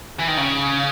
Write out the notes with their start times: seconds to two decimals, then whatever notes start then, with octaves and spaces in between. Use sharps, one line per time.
0.19 E3
0.28 D#3
0.37 C#3